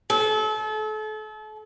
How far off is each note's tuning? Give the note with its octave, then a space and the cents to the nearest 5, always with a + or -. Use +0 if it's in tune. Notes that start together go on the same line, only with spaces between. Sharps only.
A4 -35